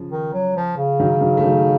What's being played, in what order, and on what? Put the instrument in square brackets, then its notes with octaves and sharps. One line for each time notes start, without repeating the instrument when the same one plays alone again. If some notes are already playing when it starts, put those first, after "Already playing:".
Already playing: [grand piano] C#3 F3
[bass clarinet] D#3
F#3
F3
C#3
[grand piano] D#3 F#3
D#3 F#3
A3
D#3 F#3